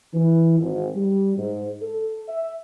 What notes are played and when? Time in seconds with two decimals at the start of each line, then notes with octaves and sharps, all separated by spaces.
0.14 E3
0.60 G#1
0.96 G3
1.38 G#2
1.82 A4
2.28 E5